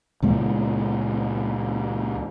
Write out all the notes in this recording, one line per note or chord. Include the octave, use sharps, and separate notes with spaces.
C#2 A#2 G#3 B3